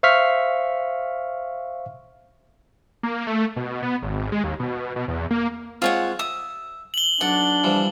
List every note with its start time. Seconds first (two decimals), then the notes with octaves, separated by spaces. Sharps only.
0.03 C5 E5 F5 C#6 F6 B6
3.03 A#3
3.27 A3
3.56 B2
3.83 B3
4.03 G#1
4.32 G#3
4.44 D#2
4.60 B2
4.96 B2
5.08 E2
5.31 A#3
5.82 G#3 C4 F4 C#5 F#5
6.19 E5 D#6
6.94 F#7 G7
7.21 B1 D4 D5 F#5
7.64 E3 F3 G3